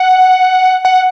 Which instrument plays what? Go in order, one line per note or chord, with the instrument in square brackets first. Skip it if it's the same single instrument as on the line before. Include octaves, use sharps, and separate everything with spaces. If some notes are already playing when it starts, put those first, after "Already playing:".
Already playing: [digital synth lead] F#5
F#5